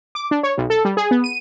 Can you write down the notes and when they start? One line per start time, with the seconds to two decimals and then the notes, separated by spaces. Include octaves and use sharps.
0.15 D6
0.31 D4
0.43 C#5
0.58 B1
0.70 A4
0.85 G3
0.97 G#4
1.11 B3
1.24 D#7